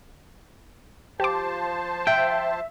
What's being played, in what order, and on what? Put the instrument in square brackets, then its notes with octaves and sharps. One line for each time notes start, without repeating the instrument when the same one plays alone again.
[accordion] F3 C5 A5 [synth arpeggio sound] G4 D6
[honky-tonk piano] E5 [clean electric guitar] G5